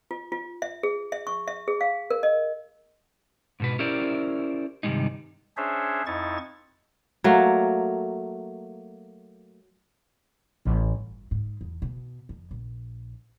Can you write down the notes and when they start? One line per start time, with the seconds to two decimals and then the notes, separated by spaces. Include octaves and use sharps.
0.11 F4
0.32 F4
0.62 E5
0.83 G#4
1.12 E5
1.27 C#6
1.48 E5
1.68 G#4
1.81 F5
2.10 A#4
2.23 D#5
3.60 G#2 B2 B4
3.79 C#4 E4 G4 A#4 C5 D5
4.83 G2 C3 D#3 G3 G#3 D#4
5.57 C#4 D4 G#4 C5 C#5 E5
6.06 F2 D#4 E4 C#6 A6
7.24 F#3 A3 A#3
10.65 A1
10.95 G1
11.31 G#2
11.61 E2
11.82 B2
12.29 F2
12.51 A#1